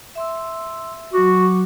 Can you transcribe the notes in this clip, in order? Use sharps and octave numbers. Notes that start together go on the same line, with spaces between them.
E5 C6 E6
F#3 F#4 D6